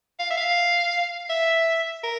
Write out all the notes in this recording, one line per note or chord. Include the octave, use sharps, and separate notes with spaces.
F5
E5
F5
E5
A#4